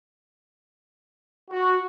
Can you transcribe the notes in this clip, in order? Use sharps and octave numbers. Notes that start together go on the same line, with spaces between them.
F#4